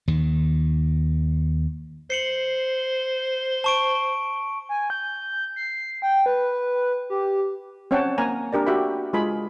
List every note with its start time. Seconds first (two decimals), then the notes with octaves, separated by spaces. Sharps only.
0.08 D#2 D#3
2.10 C5 C7 C#7 F#7
3.64 A5 C#6 D7
4.69 G#5
4.90 G6
5.56 C7
6.02 G5
6.26 B4
7.10 G4
7.91 C4 C#4 C#5 F#5 G5 A5
8.18 A#3 A#4 G#5 A#5
8.53 D4 G4 A#4 D5
8.66 F#4 G4 E5 G5 B5
9.13 G#3 F4 G#4 B5